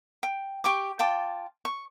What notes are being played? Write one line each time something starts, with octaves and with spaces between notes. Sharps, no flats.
G5
G4 G5 C#6 D6
F4 G5 A5 D6
C#6